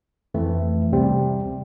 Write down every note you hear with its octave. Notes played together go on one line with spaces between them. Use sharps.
F2 E3 A3 C4
C2 C3 G3 C4